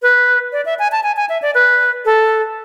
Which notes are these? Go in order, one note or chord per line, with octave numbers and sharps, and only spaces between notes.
B4
D5
E5
G#5
A5
G#5
G#5
E5
D5
B4
A4